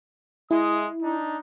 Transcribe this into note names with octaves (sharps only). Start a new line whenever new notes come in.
G#3 E4 D#6
D4 D#4